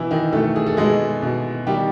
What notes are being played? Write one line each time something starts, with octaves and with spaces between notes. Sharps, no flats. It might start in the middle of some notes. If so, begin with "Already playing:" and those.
Already playing: B2 E3 E4
D#3 D#4
B2 A3 A4
G#4
A4
B2 G#3 G#4
B2
D#3 G3 G4